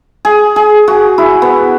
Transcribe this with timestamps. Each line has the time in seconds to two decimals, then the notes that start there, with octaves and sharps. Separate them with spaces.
0.25 G#4
0.56 G#4
0.88 F#4
1.18 E4
1.42 B3